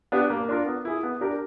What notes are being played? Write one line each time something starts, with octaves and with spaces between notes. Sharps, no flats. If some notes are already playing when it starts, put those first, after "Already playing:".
B3 D4 G4
A#3
D4 F4 A#4
B3
E4 G#4
B3
D4 G4 A#4